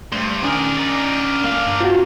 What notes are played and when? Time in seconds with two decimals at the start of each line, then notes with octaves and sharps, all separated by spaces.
0.12 G2 A3 C5
0.43 D#3 C#4 D4 G#4 A#4
0.77 D#4 D5
1.44 G1 A#3 F5 D6
1.67 G2
1.81 C4 F4 F#4